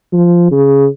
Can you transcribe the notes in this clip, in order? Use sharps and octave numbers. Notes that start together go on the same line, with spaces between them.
F3
C#3